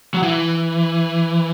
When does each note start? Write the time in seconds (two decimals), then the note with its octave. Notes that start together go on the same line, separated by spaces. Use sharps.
0.14 F#3
0.23 E3